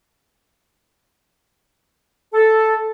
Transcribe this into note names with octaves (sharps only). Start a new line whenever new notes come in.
A4